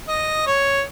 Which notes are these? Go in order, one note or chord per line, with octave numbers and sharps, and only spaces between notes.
D#5
C#5